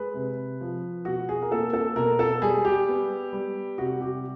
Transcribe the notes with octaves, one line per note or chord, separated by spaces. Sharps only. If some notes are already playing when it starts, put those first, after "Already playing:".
Already playing: G#3 B4
C3
F3
B2 F#4
G#4
A#4
A#3 A4
A4
B2 A#4
A4
G3 G#4
G4
B3
G3
C3 F#4
G4